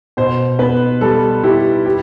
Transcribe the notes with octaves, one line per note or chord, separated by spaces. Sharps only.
B2 C5
B3 B4
G3 A4
E4 G4
G4